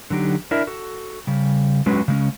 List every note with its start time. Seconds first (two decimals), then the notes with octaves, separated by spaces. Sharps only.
0.10 D3 F#3 D#4 G4
0.51 D4 E4 A#4 D#5 E5
0.67 F#4 A4
1.27 C#3 G3
1.86 F#3 G#3 C#4 F#4 B4
2.08 C#3 G#3 C#4